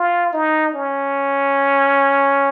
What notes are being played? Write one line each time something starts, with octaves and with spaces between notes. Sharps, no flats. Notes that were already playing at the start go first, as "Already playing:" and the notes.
Already playing: F4
D#4
C#4